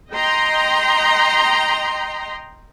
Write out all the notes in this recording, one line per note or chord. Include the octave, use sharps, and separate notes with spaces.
D#5 G5 A#5 C6